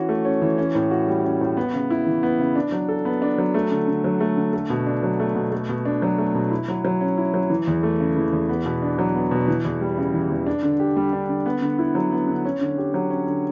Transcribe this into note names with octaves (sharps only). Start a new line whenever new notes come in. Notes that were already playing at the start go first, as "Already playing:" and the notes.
Already playing: E3 C#4 F#4
A3
C#4
E3
C#4
A2
F#4
G3
C#4
A2
B3
C#3
E4
E3
B3
C#3
D4
F#3
A4
B3
D4
F#3
A3
D3
D3
F#3
A3
D3
A3
B2
D4
F#3
A3
B2
A3
B2
D4
F#3
A3
B2
E4
F#3
F#3
C#4
E4
F#3
E3
E2
A3
C#3
E3
E2
B3
B2
D4
F#3
B3
B2
E3
E2
G3
C#3
E3
E2
D4
D3
G4
G3
D4
D3
B3
D3
E4
F#3
B3
D3
C#4
D3
G4
F#3
C#4
D3